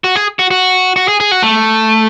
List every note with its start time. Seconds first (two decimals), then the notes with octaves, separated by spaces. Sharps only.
0.04 F#4
0.16 G#4
0.39 F#4
0.51 F#4
0.96 F#4
1.08 G#4
1.20 G#4
1.31 F#4
1.43 A3